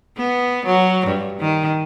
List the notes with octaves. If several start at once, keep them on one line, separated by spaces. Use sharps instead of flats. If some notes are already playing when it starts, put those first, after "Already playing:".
B3
F#3
G2
D#3